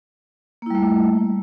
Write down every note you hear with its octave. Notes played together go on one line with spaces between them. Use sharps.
G3 A3 A#3 E4